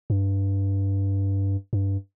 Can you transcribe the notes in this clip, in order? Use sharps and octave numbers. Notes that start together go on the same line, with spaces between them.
G2
G2